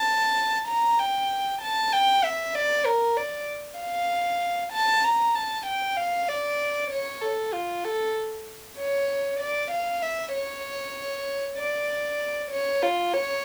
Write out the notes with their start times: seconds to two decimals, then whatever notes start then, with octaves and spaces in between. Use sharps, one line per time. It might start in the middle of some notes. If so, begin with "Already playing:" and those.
Already playing: A5
0.68 A#5
0.99 G5
1.61 A5
1.92 G5
2.23 E5
2.55 D5
2.85 A#4
3.17 D5
3.79 F5
4.73 A5
5.04 A#5
5.35 A5
5.66 G5
5.97 F5
6.28 D5
6.91 C#5
7.22 A4
7.53 F4
7.84 A4
8.78 C#5
9.40 D5
9.71 F5
10.02 E5
10.34 C#5
11.58 D5
12.51 C#5
12.82 F4
13.13 C#5